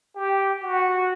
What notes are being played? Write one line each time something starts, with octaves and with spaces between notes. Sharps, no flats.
G4
F#4